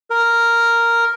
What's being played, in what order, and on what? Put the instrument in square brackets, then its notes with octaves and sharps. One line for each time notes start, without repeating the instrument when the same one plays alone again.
[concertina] A#4